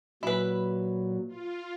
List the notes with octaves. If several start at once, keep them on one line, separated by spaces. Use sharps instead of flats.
A#2 F#3 E4 B4
F4